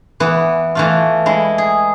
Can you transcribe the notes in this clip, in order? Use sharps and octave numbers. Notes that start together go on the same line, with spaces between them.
E3 B3
E3 A3 F4
G#3 E4
G#4